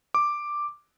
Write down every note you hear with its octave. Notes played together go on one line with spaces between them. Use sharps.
D6